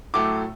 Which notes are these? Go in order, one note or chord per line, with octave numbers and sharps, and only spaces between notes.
A2 F#3 A3 D6